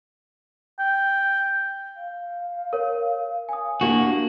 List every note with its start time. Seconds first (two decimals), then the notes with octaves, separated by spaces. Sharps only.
0.79 G5
1.96 F5
2.73 A#4 C#5
3.49 G#5 D#6
3.81 A#3 D4 E4 F#4 G4